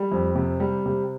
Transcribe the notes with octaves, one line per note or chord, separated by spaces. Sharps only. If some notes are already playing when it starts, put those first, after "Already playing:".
Already playing: G3
F2
C3
G3
C3